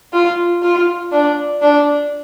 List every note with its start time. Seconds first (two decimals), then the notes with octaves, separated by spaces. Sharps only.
0.13 F4
0.63 F4
1.12 D4
1.62 D4